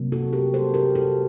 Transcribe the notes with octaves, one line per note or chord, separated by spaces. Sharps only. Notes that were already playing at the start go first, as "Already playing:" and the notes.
Already playing: C3 F#3 A#3
F#4 A4
G4 A#4
C3 F#3 A#3 A4 C5
G4 A#4
F#4 A4